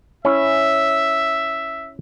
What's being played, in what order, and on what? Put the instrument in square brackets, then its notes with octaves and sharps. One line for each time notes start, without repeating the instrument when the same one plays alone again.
[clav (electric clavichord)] C#4 E4 [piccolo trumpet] E5